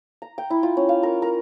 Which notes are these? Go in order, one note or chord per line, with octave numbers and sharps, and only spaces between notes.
A#5
G5
E4
F4
C#4
F5
A#4
A#4